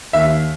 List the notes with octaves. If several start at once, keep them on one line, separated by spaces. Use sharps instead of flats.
D#2 E5